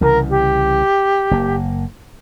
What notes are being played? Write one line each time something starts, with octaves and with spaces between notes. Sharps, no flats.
C2 C#3 E3 A#4
G4
F#1 A#3